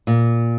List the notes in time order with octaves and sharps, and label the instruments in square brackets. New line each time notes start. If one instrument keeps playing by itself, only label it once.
[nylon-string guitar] A#2